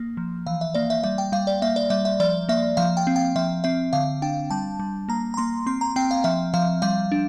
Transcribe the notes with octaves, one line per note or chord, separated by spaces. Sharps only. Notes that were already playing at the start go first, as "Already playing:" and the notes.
Already playing: A#3
F3
E3 F5
E5
A#3 D5
E5
G3 E5
G5
G3 F5
D5
A#3 E5
D5
G3 E5
E5
F3 D5
A#3 E5
F3 F5
G5
C4
G5
F3 E5
C4 E5
D3 F5
D4 G5
G3 A5
G3
A#3 A#5
A#5
A#3 C6
C4 C6
A#5
C4 G5
F5
F3 E5
F3 F5
G3 F5
D4